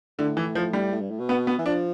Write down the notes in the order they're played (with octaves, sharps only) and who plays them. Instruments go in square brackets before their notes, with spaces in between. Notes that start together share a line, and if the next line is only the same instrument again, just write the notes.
[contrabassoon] A2 [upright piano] D3
[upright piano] E3
F3
G3
[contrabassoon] A2
G2
A2
B2
[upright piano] B3
B3
[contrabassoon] E3
[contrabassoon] F3 [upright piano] D4